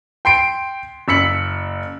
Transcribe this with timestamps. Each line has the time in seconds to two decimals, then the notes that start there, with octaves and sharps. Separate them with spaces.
0.25 G5 C6 C7 D7
1.08 F#1 E6 B6 C#7 F#7